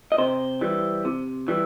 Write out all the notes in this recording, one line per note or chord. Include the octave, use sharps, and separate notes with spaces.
D#5
C3 C5
E3 G3
C3
E3 G3